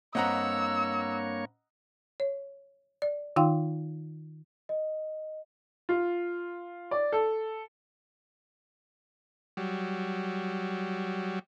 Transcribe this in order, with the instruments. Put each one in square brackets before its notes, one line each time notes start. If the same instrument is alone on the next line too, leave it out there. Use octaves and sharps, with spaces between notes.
[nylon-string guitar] G2 C4 [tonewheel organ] A#3 C#5 [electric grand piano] D#5 F#5 A#5 [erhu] E6
[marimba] C#5
D5
D#3 D#4 F4 F5 G5 C6
[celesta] D#5
[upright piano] F4
D5
A4
[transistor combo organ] F#3 G3